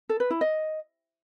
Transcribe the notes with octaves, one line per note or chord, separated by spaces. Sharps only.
A4
B4
E4
D#5